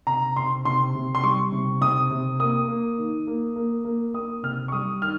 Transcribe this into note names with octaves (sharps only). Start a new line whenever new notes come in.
C3 A#5
C3 C6
C3 C6
C3
C6
G3 C#6
C3
C3 D#6
C3
A#3 D#6
A#3
D#3
A#3
A#3
A#3
A#3 D#6
C3 F6
C#6
G3 D#6
D#3 F6